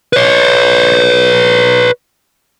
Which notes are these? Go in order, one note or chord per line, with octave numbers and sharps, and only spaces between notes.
B4 C#5